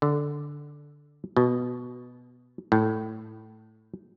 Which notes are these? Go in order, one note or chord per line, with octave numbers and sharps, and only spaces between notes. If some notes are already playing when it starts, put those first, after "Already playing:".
D3
B2
A2